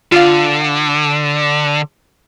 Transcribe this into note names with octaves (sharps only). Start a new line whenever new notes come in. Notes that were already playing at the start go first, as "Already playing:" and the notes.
D3 F4 F5